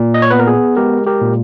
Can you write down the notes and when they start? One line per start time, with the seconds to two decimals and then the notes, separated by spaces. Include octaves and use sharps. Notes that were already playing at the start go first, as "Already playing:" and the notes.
Already playing: A#2
0.14 D#5
0.22 C#5
0.31 B3 B4
0.39 A#4
0.47 G#4
0.77 G#3 G4 A#4
1.07 G4 A#4
1.21 A#2